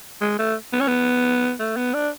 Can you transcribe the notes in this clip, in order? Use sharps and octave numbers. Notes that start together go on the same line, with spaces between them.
G#3
A3
B3
C#4
B3
A3
B3
D4